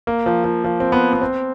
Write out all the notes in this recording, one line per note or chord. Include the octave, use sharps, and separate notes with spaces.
A#3
F3
F3
F3
C4
B3
B3
C4